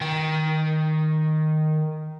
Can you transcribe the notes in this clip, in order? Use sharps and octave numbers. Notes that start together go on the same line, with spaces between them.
D#3 G5